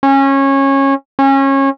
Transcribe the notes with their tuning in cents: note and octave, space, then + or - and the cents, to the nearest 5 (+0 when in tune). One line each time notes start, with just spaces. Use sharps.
C#4 -20
C#4 -25